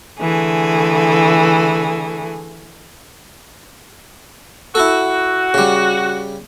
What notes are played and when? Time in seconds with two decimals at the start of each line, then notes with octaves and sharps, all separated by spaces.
0.19 D3 E3 A3 G#4
4.75 E4 F#4 A4
5.54 C#3 G3